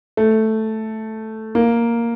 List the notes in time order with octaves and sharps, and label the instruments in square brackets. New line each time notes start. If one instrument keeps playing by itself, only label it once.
[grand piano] A3
A#3